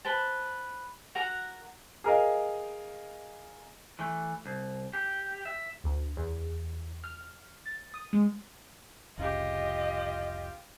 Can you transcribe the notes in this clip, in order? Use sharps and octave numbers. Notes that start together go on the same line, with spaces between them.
B4 C5 A5
F#4 A#4 F#5 A#5
G#4 A#4 D#5 F5
E3 A3
C2
G4
E5
D2
E2
F6
A6
D#6
G#3
F1 C2 C#3 F4 G4 D#5